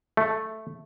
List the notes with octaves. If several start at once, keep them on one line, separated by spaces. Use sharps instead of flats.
A3